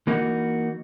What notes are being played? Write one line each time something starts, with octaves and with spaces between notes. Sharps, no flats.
E3 A#3 D#4 F#4